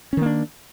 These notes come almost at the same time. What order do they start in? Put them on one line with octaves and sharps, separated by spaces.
C#4 D#3 A#3 D4